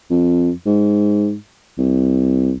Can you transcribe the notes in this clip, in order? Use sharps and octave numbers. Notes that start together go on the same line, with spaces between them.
F2
G#2
C2